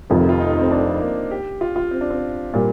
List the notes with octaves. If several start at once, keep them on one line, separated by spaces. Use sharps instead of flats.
F1 F2 C3 D#3 F3
F4
D#4
C4
D4
A#3
G4
F4
F4
C4
D4
C4
A#2 G3